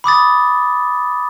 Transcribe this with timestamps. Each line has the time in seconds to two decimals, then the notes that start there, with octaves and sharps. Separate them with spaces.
0.04 B5 D6 D#6 A6